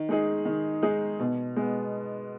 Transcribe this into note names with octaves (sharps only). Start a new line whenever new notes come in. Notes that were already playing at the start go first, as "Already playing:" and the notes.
Already playing: D#3
G#3 D#4 G#4
D#3
G#3 D#4 G#4
B2
G#3 B3